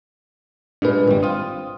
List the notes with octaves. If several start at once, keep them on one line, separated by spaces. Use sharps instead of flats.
G2 A#2 G#3 D4 B4
G#1 G3
C4 F4 D#6